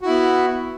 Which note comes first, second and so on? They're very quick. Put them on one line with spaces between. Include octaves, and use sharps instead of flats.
F#4 E4 B3